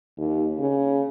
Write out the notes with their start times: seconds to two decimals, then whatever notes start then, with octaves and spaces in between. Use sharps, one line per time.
0.17 D#2
0.59 C#3